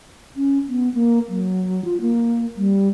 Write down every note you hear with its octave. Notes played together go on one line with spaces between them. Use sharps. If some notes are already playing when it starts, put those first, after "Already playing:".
C#4
B3
A#3
F#3
F4
A#3
G3